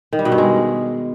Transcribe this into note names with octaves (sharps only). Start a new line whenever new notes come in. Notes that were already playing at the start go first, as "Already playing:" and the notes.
D#3
G3
B2
G2
G#3